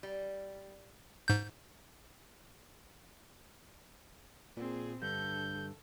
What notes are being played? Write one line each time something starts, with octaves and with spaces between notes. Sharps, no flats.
G3
G#2 G6
A#2 C4 G#4
G2 D3 A4 G6